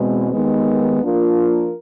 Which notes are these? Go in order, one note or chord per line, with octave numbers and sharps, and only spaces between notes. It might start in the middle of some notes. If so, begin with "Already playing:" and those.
Already playing: E2 B2 G#3 C4
D#2 D#3 G#3 B3
F3 A#3 D4 F4 A#4